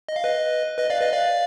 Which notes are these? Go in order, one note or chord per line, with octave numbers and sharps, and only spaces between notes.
D#5
F5
B4 D#5
B4 D#5
D5 F5
B4 D#5
D5 F5